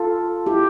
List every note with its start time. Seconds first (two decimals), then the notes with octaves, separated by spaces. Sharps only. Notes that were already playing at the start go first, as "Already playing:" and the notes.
Already playing: F4 A4
0.46 E4 G4